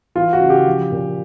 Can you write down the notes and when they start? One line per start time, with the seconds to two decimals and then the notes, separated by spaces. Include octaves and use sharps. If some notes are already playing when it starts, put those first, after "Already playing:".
0.15 E3 F4
0.33 F#4
0.41 C#3
0.50 G4
0.67 F3
0.92 A#2